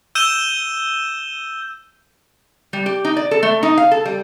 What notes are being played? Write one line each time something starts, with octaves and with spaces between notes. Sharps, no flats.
E6 G6 D#7 E7 G7
G3
G4
D#4
D5
A4
A3
D#4
F5
A4
G3